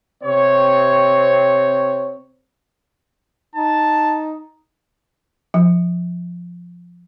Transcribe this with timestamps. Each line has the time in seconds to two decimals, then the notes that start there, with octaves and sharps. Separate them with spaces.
0.24 C3 C4 C#5
3.55 D#4 A5
5.54 F3